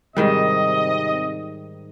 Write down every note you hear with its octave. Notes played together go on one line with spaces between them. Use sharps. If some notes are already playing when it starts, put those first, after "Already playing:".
G#2 C3 D#3 G3 D#5